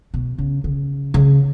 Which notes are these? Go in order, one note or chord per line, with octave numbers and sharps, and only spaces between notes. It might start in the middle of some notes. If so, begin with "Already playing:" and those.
B2
C#3
C#3
C#3